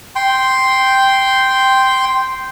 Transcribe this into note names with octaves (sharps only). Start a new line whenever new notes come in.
G5 C6